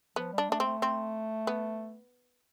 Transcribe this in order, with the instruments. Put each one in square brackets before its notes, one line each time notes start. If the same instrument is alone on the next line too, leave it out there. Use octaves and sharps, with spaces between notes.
[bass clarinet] F3 [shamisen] B3
[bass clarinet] G3
[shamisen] D4
[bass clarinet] A3 [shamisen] D4
[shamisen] C4
[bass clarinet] A3
[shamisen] C4
B3